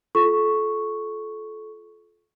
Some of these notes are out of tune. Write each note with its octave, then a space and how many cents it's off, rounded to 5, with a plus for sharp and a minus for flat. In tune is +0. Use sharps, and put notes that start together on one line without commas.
F4 +0 A4 -30 C#6 +0